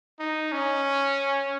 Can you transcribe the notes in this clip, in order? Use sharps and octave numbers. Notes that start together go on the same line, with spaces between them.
D#4
C#4